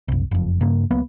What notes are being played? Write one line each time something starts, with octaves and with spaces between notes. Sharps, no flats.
F#1 C2
F#1 F2
G2 C#3 A#3
C#2 F#3 A#3 B3